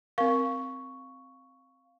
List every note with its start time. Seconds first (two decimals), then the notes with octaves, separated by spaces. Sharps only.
0.18 C4 A#4 F5 C#6